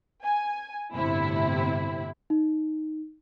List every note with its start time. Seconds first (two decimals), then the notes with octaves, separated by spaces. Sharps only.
0.24 G#5
0.95 G1 A2 C3 E4
2.30 D#4